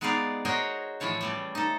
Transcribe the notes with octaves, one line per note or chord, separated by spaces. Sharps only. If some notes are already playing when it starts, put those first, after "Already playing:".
G#3 B3 D#4 G#4 D5 F5
F#4 G#4 A#4 C5 C#5 D#5
A2 E3 F3 E4 C#5 A5
C#3 G3 A3
D#4 A4